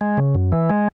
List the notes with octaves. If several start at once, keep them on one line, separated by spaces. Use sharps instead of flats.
G#3
C#3
F#2
E3
G#3